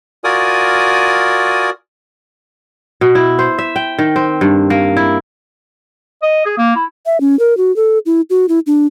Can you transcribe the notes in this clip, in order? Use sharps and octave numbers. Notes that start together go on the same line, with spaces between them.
F4 F#4 A#4 D5 G#5 D#6
B2
E4
C5
E5
G5
D#3
C4
G2
A#3
E4
D#5
G#4
A#3
E4
E5
C#4
A#4
F#4
A4
E4
F#4
E4
D4